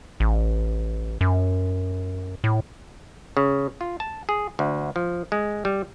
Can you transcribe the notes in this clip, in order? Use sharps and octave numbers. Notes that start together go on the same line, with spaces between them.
A1
F#2
A2
C#3
F4
A5
G#4
D2
F3
G#3
G3